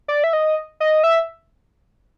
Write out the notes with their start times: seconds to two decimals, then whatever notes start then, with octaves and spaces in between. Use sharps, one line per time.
0.08 D5
0.24 E5
0.33 D#5
0.80 D#5
1.04 E5